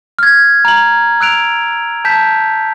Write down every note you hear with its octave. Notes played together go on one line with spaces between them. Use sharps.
F6 G#6
A#5 F#7
E6 F#6 D7 F7
A5 G6 B6